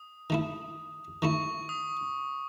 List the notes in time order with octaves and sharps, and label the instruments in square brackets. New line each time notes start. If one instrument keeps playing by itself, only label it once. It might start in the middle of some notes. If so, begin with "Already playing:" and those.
Already playing: [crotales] D#6
[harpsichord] D#3 A3 E4
[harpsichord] D#3 A3 E4 [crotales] C#6
[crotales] D#6